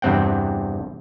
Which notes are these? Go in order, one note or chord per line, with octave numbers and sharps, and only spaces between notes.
E2 G2 C3 C4 F#5 G5